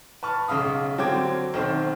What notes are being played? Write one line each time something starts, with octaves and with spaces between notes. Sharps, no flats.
B4 A5 C#6 F6
B1 C#3 E5 F5 D#6
D3 F#3 C4 G5 D6 G#6
B1 D#3 C4 C5